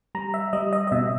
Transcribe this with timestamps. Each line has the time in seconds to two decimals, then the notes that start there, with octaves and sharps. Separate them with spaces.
0.15 G3 A#5
0.34 E5
0.53 G3 D#5
0.73 D#5
0.87 D#5
0.92 B2 E5